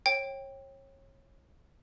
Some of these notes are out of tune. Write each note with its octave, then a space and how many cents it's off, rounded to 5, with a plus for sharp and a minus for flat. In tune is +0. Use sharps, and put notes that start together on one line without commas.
C#5 -30 G5 +0